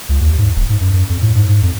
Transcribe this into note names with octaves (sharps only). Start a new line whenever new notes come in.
C#2
D#2
G#2
D1
G#2
F#2
F#2
F2
A2
G#2
G#2
F2